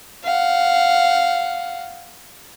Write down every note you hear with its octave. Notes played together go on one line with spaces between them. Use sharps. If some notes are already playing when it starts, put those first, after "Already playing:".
F5 F#5